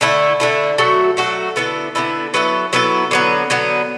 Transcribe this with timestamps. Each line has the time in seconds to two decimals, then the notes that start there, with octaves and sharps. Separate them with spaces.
0.01 D3 A3 E4
0.40 D3 A3 E4
0.78 F#3 A3 F#4 A4
1.17 F#3 A3 F#4 A4
1.56 D3 B3 E4 A4
1.95 D3 B3 E4 A4
2.34 F#3 B3 E4 A4
2.73 F#3 B3 E4 A4
3.11 D3 F#3 B3
3.50 D3 F#3 B3